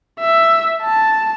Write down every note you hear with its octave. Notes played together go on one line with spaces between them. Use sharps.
E5
A5